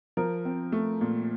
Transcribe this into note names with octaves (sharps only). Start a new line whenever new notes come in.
F3 A#4
C4
A3
A#2